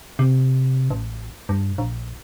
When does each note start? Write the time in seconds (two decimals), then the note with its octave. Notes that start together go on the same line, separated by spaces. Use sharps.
0.19 C3
0.90 A1
1.49 G2
1.78 A#1